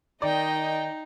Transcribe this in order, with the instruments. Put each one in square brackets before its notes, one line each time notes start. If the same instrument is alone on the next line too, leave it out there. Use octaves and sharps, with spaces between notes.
[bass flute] D#3 [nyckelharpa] D#4 [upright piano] D5 [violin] D#5 G5